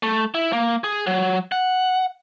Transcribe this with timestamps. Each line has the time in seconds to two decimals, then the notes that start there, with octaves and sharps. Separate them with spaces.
0.03 A3
0.35 E4
0.53 A#3
0.84 G#4
1.07 F#3
1.52 F#5